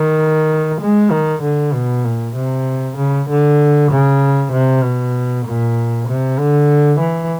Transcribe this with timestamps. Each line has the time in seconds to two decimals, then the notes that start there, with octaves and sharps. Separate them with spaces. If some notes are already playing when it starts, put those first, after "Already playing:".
Already playing: D#3
0.81 G#3
1.11 D#3
1.43 D3
1.74 B2
2.05 A#2
2.36 C3
2.97 C#3
3.29 D3
3.91 C#3
4.52 C3
4.83 B2
5.46 A#2
6.08 C3
6.39 D3
7.00 E3